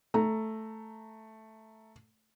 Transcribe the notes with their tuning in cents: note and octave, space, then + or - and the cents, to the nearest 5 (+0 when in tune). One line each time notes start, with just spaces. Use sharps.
A3 +0 A#5 -10